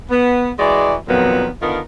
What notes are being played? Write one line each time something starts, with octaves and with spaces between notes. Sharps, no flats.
B3
E3 G#3 F#4 D5
F2 A#2 D#3 F#3 B3
D3 D#3 B3 F4 A#4